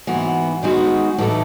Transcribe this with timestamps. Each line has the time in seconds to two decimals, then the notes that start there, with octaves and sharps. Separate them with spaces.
0.07 G#2 E3 B3 F#4
0.63 D#3 G#3 B3 D#4 F#4
1.18 A2 E3 B3 D#4 A4